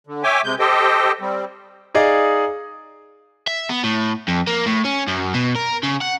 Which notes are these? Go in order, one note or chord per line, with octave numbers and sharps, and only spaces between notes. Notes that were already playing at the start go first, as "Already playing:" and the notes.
D3
C#5 E5 G5 G#5 D6
C3 G#3 G6
G4 A4 C5 D#5 G5
G3 C4
D#4 G#4 D5 D#5 F5
E5
B3
A2
F2
A#3
A2
C#4
F#2
B2
A#4
C#3
F#5